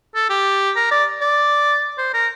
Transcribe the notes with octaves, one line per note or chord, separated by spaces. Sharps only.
A4
G4
A#4
D5
D5
C5
A#4